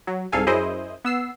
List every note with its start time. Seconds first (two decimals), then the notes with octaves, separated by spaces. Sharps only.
0.07 F#3
0.32 C2 G#2 A4 F5 G#5
0.47 F#2 E4 G#4 C5 D#5
1.05 B3 E6 C7